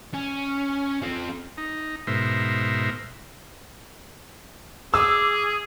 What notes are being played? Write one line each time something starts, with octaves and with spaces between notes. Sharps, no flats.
C#4
F3 C4
D#4
G#2 B2 A#4 C5 E5
G#4 D6 E6